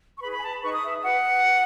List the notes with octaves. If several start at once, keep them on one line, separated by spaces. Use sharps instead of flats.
C#6
E4 G#4 B4 B5
B5
G#5
A5
B5
D#4 G#4 B4 C#6
D#6
E5
F#4 B4 F#5
F#4 B4